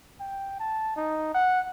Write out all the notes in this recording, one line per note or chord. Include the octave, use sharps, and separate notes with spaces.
G5
A5
D#4
F#5